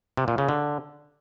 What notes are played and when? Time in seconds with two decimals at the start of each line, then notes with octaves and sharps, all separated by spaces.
0.17 C3
0.28 A#2
0.38 C#3
0.49 D3